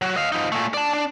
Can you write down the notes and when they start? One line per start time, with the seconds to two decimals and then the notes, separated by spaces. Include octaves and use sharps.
0.01 F#3 F#4
0.16 D#5 F5
0.32 F3 D#4
0.52 A#2 A3
0.74 D5 A5
0.93 D4